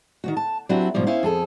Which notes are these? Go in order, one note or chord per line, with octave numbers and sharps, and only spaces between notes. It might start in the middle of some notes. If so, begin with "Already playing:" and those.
D#3 F#3 F#4
A5
F#3 C4 D4 E4 F#4 G4
G#2 B2 D#3 F3 G3
B3 C#4 E4 C5 F5
F2 G#4 A4